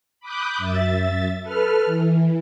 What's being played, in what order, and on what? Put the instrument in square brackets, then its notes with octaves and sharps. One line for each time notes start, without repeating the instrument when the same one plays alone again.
[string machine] B5 D6 D#6 F#6 G6
F#2 E5 A6
A4 B4 F6
E3